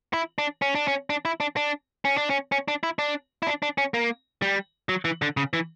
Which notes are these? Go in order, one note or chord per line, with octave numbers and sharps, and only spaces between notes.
E4
D4
C#4
D4
C#4
D4
E4
D4
D4
C#4
D4
C#4
C#4
D4
E4
D4
E4
D4
D4
C#4
A#3
G3
F#3
E3
D3
C#3
E3